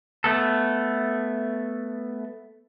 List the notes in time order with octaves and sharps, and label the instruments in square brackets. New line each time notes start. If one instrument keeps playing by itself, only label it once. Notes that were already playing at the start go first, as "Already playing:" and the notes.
[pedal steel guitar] A3 B3 A4